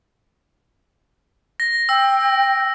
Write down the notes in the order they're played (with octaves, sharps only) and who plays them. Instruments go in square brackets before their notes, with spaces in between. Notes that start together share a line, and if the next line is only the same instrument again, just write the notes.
[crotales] A#6
[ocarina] G5 [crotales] E6